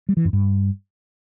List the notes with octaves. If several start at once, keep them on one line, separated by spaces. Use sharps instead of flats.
G3
E3
F#2
G2